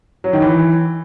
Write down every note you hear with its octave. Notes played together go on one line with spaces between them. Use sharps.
F#3
D#3
E3